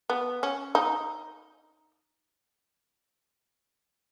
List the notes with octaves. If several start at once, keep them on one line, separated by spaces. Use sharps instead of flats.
B3
C#4
D#4